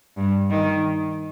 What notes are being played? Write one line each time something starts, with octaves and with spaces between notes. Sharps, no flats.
G2
D#3